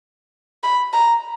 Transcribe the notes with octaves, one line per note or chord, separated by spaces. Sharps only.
B5
A#5